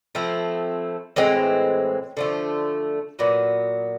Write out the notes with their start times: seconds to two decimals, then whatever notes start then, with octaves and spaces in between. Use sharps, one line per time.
0.15 F3 A3 C4 E4
1.16 A2 E3 G#3 C4
2.17 D3 F3 A3
3.19 A#2 F#3 B3